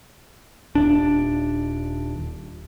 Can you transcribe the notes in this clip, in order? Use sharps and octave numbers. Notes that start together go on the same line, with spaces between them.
D#1 D4